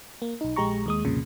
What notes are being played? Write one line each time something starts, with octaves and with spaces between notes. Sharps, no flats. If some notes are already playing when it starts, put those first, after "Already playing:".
A#3
B1 D#4
A#1 G#3 G4 A#5 C#6
D#2 G#3 D#6
C2 F2 A#2 C#3